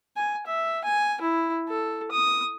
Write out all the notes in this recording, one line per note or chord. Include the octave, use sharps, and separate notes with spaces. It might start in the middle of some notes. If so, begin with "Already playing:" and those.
G#5
E5
G#5
E4
A4
D#6